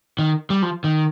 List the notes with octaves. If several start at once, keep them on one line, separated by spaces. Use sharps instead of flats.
D#3
G3
F3
D#3